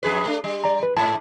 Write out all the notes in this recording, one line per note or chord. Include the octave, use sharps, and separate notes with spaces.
F2 G#4 B4
A3 D4
G3
D5 A#5
B4
G#2 A5